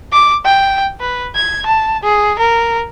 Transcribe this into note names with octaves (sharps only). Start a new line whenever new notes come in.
D6
G5
B4
G#6
A5
G#4
A#4